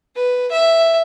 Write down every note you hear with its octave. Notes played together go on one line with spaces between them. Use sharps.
B4
E5